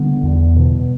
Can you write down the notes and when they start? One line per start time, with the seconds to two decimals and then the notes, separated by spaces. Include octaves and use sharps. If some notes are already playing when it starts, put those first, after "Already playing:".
Already playing: D3 G3 B3
0.23 E2
0.56 B2